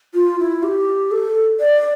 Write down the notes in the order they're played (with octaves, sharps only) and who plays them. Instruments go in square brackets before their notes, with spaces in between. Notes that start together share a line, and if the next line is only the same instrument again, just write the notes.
[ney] F4
E4
G4
A4
D5